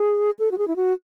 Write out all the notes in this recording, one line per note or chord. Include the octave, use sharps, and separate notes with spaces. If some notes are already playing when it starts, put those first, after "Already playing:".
Already playing: G#4
A4
F#4
G#4
E4
F#4